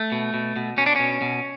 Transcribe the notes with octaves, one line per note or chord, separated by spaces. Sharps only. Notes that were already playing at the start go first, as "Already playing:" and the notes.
Already playing: A3
B2
B2
B2
B2 C#4
D4
B2 C#4
B2